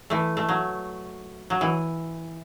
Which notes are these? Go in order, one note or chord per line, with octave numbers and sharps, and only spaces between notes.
E3 A3
A3
F#3
F#3
E3